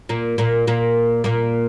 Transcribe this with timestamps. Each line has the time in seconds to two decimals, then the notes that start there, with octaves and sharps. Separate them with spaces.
0.09 A#2 A#3
0.38 A#2 A#3
0.67 A#2 A#3
1.24 A#2 A#3